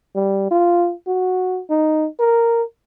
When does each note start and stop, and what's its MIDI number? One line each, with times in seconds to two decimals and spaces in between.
0.15 0.49 55
0.51 0.93 65
1.07 1.61 66
1.70 2.07 63
2.20 2.63 70